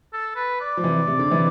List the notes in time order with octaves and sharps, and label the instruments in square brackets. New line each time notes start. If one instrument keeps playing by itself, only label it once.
[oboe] A4
B4
D5
[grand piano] F3
C3 E3
C3
D3
C3 E3